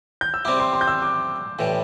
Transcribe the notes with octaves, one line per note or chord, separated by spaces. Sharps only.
G6
E6
G3 C4 E4 D6
C6
C6
G6
E6
D6
A2 E3 G3